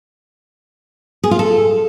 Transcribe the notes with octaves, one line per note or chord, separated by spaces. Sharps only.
G#4
F4
A4